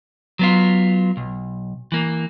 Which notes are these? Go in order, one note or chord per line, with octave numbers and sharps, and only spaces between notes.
F#3 B3 F4
B1
E3 A#3